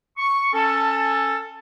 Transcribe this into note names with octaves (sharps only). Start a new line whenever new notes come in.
C#6
C#4 A4 A5